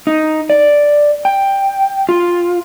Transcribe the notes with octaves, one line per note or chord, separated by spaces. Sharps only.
D#4
D5
G5
F4